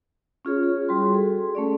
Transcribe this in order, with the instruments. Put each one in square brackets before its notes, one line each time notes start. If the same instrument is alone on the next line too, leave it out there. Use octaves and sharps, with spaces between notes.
[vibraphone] C#4 F4 G#4 C#5
G#4
G3 F#4 C6
G#4 A4
A3 C#4 D5